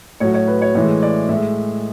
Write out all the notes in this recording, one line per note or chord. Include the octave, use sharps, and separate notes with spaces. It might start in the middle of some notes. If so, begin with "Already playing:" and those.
A2 F#3 C#5
C#5
B4
C#5
A2 E3 G#3 C#5
D5
A2 G#3 E5